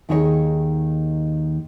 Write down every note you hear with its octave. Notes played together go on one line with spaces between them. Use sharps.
D#2 D#3 D#4 G#4 A4 C#5